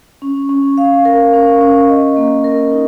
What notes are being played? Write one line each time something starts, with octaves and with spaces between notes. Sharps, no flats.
C#4
C#4
F5
A#4
C#4
C#4
D#5
A#3
A#4
D#4